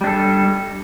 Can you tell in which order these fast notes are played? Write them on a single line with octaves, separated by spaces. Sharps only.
G3 D4 A4